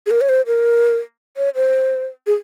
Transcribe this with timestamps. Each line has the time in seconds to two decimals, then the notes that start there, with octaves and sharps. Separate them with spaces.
0.06 G#4
0.11 A#4
0.21 C#5
0.29 C5
0.47 A#4
1.37 C#5
1.55 C5
2.27 G#4